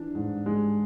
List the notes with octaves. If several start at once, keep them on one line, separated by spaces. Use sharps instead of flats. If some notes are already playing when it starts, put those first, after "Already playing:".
Already playing: E3 D4
G#2
G#3